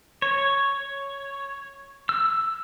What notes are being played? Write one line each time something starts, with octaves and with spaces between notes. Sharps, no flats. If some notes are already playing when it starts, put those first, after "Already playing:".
C#5
E6